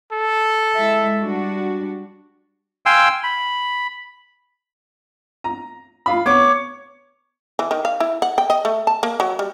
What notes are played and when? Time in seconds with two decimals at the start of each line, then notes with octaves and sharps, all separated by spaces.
0.12 A4
0.76 G#3 E4 E5
1.22 G3 D4 F#4
2.86 F5 G5 G#5 C6 E6
3.23 B5
5.44 A#5
6.06 F4 F5 B5
6.26 B3 C#5 D6
7.59 E3
7.71 D#3
7.85 F5
8.00 E4
8.22 F#5
8.38 G5
8.50 D#5
8.65 A3
8.87 A5
9.03 A#3
9.20 F#3
9.39 G3